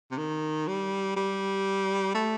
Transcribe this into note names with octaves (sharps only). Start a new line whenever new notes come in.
C3
D#3
G3
G3
A3